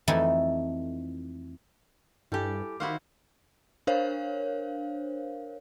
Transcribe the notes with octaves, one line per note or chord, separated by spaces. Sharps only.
F2 E3 A3 D#4 E4 A4
G2 G3 E4 G4 A4 G#5
D#3 E4 F#4 C5 F5 B5
D4 A#4 C5 C#5 F5